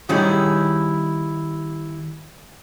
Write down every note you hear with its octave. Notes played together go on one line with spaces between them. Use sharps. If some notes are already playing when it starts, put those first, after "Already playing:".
D#3 G3 C#4 D#4 E4 G#4